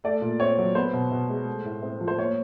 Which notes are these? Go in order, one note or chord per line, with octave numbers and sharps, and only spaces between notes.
A3 D5
A#2
C4 C#5
F#3
B3 C5
B2
B2
G#3
A3
A2
C4
F3
C5
A#3 C#5